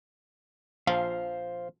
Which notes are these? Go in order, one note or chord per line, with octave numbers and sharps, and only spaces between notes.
A#1 F3 F4 C5 F5